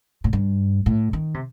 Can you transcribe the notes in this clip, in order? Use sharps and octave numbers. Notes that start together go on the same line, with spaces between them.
A2
G2
A2
D#3
C3